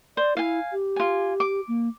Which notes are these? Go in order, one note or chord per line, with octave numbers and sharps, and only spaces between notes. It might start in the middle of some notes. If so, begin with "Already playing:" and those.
C5 D5
E4 F5 G#5
G4
F4 G#5
D6
A#3